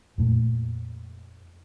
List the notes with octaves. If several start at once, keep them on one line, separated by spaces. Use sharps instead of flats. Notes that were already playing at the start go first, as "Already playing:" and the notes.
F2 A#2 A3